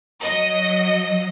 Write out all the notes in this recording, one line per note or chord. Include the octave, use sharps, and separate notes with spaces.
F#3 D#5